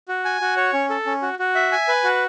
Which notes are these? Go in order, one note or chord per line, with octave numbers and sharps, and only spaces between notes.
F#4
G#5
F#4
C#5
C#4
A4
C#4
F#4
F#4
E5
G#5
B4
F#4